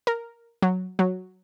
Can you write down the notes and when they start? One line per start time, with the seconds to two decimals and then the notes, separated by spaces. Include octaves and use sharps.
0.07 A#4
0.62 F#3
0.99 F#3